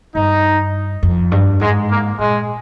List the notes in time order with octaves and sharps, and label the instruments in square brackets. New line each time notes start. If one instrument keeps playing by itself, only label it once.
[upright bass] G2 [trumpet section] D#4
[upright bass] F2
G2
[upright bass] G#2 [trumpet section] G#3
[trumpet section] A#3
[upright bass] A#2 [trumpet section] G#3